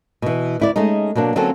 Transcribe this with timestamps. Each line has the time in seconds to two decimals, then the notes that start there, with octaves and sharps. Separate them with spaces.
0.22 B2 E3
0.60 D2 E4 D5
0.76 G#3 A3 C#4 D#4
1.15 B2 F#3 A#3 D4
1.36 D3 F#3 A#3 C4 C#4 A4